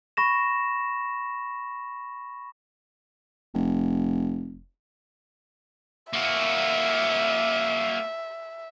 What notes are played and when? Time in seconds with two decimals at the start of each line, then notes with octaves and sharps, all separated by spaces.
0.17 B5 C#6 A#6 E7
3.54 F1
6.13 A#3 F#4 E5